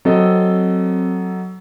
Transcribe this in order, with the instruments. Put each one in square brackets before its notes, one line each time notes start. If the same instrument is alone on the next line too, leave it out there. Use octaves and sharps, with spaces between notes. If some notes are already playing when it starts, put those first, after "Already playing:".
[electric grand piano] F#3 A4 D#5 [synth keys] C4